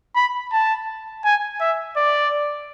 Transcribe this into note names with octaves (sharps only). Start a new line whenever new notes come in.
B5
A5
G#5
E5
D5